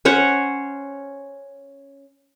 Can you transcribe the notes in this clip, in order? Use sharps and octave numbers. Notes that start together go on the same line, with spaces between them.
C#4 C5 C#5 F#5